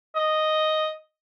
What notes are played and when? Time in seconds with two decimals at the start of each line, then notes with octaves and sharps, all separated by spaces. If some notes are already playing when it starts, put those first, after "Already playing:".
0.16 D#5